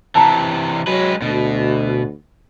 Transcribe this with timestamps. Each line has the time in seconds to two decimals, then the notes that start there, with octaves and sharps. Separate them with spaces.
0.15 C3 E3 A5 A#5
0.87 F#3 G#3 B4
1.22 D2 B2